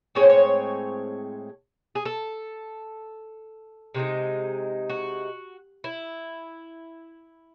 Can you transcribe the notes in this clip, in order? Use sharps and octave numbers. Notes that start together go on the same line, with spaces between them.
A2 G#3 C4 C#5
C5
C#5
G#4
A4
C3 E3 G#3 D#4
F#4
E4